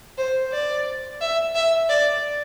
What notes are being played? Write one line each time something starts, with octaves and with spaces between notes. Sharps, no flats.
C5
D5
E5
E5
D5